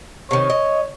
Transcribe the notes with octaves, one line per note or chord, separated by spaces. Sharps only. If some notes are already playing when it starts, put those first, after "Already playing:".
C3 D#3 C#5
D#5